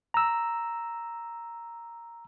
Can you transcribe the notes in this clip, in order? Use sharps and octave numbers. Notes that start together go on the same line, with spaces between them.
A#5 E6